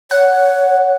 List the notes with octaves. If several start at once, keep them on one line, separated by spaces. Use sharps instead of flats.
C#5 F#5